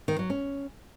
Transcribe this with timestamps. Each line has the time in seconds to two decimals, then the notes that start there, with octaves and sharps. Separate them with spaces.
0.08 D#3
0.19 F#3
0.30 C#4